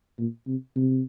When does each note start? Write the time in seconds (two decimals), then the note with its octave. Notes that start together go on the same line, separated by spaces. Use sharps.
0.19 A#2
0.47 C3
0.76 C3